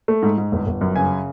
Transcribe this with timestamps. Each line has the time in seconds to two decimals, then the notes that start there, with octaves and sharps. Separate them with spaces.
0.08 A3
0.23 G#2
0.38 G#2
0.52 G1
0.67 G1
0.81 F#2
0.96 C#3 G#5